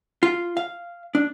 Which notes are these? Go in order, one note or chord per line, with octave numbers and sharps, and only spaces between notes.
F4
F5
D4